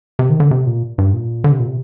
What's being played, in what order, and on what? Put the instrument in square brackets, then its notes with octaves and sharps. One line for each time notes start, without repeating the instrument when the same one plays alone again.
[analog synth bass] C3
D#3
D3
C3
A#2
G2
A#2
D3
C3
A#2
C3